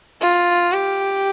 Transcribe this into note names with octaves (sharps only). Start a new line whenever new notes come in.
F4
G4